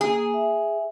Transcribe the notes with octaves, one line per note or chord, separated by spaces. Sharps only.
A#3 G#4
E5